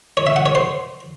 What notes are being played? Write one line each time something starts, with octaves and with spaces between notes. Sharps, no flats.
C#5
E5
F#5
C#5
C5